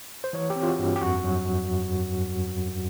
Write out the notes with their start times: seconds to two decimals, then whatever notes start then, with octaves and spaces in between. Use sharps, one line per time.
0.24 C5
0.33 E3 C#5
0.50 G4
0.56 C4
0.63 F4
0.68 F#4
0.79 G2
0.96 G4
1.02 F2 F#4
1.24 F#3